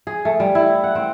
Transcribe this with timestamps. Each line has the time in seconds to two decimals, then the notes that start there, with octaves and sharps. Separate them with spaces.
0.07 G#4
0.25 A3
0.40 G3
0.55 E4
0.84 F#5
0.95 C4